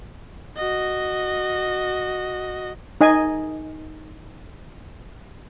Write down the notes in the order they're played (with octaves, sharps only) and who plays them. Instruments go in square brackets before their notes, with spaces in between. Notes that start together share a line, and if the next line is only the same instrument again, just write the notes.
[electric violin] F#4 D#5
[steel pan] D#4 D#5 G#5